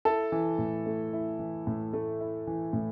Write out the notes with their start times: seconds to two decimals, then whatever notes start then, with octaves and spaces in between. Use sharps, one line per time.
0.05 E4 A4 A5
0.32 E3
0.58 A2
0.86 A3
1.13 E4
1.39 E3
1.67 A2
1.93 A3
2.21 E4
2.47 E3
2.73 A2